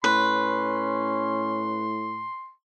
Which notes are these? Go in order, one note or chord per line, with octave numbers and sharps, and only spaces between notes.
A2 C#4 B4 C6